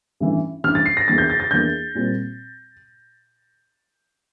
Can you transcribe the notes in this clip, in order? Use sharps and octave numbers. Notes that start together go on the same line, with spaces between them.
A1 G2 E3
A1 G2 E3 F6
A6
C7
A#6
E2 E3 A#3 D4 A6
G6
A6
A6
E2 E3 A#3 D4 G6
A#2 G3 C4